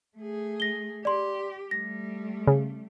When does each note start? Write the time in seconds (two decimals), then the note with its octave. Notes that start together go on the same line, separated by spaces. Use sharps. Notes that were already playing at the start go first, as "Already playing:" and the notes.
0.17 A3 G#4
0.60 A#6 G7
1.05 G4 D5 C6
1.71 G3 A3 A#6
2.47 C#3